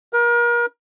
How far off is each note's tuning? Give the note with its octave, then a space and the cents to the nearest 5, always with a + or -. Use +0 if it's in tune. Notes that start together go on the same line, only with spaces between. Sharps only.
A#4 +35